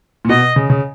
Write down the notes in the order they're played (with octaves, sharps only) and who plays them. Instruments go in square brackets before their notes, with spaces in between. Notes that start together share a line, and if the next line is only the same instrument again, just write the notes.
[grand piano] A#2
[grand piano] B2 [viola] D#5
[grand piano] C#3
C#3